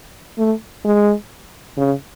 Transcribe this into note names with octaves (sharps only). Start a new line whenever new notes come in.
A3
G#3
C#3